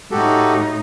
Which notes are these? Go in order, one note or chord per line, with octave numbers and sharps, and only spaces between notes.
A2 D#4 F#4 G4 A4